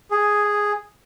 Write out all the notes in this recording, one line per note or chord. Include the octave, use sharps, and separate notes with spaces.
G#4